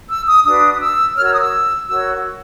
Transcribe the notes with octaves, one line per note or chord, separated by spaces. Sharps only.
E6
D#6
D4 F#4 B4 D#6
D#6
E6
F#4 A#4 C#5 F6
E6
D#6
E6
F#4 A#4 C#5 E6